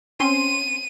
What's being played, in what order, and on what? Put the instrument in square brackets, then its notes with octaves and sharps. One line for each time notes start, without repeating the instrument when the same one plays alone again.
[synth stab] C4 C#4 C6 [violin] D#7